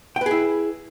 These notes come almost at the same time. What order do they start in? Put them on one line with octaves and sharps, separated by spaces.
G5 B4 G#4 E4